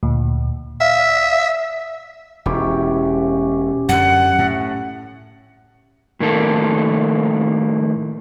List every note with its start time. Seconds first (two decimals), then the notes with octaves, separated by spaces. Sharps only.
0.03 D2 A#2
0.81 E5 F5
2.46 E1 C#4 E4 G4
3.89 F#2 D3 F#5
4.39 A2
6.20 A2 D#3 A#3 A4